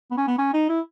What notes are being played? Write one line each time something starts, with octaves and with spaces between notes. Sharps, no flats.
B3
C#4
B3
C#4
D#4
E4